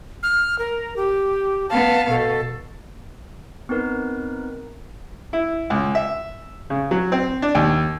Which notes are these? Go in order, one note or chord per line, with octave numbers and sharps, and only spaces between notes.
F6
A#4
G4
B3 F5 A5
B2 A4
B3 C4 D#4 A#4 B4
E4
C#2
E5
C#3
F#3
C4
D4
D#2